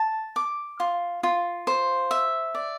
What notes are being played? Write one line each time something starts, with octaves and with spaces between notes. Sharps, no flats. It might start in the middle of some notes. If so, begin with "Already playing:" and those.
Already playing: A5
D6
F4
F4
C5
E5
D5